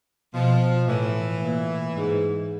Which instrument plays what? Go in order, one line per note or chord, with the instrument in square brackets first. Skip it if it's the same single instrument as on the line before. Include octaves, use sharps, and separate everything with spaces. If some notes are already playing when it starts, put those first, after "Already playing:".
[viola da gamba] B2 [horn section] F3
[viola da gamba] A2 [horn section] E3
[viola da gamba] A#2
G#2